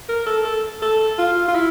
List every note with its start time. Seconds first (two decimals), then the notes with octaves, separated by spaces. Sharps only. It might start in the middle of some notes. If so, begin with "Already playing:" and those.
0.09 A#4
0.27 A4
0.45 A4
0.82 A4
1.18 F4
1.48 F4
1.55 E4